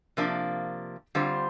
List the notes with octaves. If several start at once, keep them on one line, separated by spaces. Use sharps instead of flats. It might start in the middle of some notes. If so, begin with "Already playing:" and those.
C3 F3 A#3 D4
D3 G3 C4 F4 C5